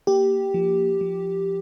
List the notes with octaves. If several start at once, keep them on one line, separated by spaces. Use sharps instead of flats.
A#3 G4
F3
F3